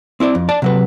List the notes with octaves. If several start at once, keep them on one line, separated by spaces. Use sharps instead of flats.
C4 E4 C#5 D5
F2
D5 A5
C3 F#3 B4